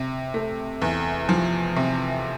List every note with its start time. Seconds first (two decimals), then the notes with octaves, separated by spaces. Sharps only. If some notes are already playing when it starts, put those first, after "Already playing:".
Already playing: C3
0.34 A3
0.82 E2
1.29 F3
1.76 C3